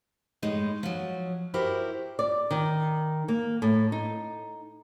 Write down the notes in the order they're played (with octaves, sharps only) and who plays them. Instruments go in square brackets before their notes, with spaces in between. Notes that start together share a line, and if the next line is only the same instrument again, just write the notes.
[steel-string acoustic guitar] A2 G#3 D#4
F3 F#3
E4 F#4 G4 A#4 C5
[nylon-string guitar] D5
D#3
A#3
A2
D#4